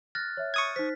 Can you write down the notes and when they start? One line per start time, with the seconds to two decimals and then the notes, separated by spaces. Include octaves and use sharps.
0.15 F6 F#6 A6 A#6
0.37 C#5 E5
0.54 C#6 D#6 G#6
0.76 D#4 C5 B6